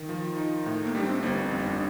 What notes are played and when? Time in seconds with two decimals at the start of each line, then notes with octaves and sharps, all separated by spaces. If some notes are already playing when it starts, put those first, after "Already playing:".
Already playing: D#3
0.09 F3
0.37 D#4
0.66 A2
0.85 A#3
0.95 G3 D4
1.04 C4
1.23 G1 A#3
1.42 C4
1.51 F2
1.61 D4